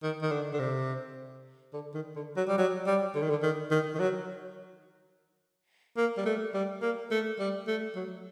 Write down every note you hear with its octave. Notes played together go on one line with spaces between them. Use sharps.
D#3
D#3
D3
D3
C3
D3
D#3
D3
F#3
G3
F#3
G3
D3
D#3
D3
D#3
D#3
D#3
F#3
A#3
G3
A3
G3
A#3
A3
G3
A3
F#3